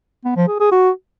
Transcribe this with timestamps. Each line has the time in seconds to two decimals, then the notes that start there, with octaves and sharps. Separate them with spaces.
0.25 B3
0.36 F3
0.48 G#4
0.60 G#4
0.72 F#4